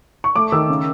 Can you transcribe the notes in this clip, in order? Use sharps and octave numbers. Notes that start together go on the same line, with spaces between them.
C#6
A3 D6
D#3 E6
C#3